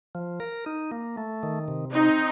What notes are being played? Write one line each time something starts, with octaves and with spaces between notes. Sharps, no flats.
F3
A#4
D#4
A#3
A3
D#3
C3
C4 D#4